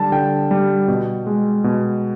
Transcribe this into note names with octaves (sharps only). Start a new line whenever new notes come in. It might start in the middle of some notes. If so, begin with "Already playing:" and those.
Already playing: D3 G3 A5
D3 G5
G3
B2
G#3
B2